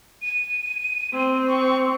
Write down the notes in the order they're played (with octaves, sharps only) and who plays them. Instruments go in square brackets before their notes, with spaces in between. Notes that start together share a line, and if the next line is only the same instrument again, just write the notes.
[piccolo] D#7
[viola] C4
[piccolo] C#6